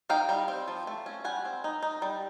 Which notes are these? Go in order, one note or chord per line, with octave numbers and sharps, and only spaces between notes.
D#4 F5 G5
G3
C4
F3
A3
C#4
G3 F#5 G#5
C4
D#4
D#4
G3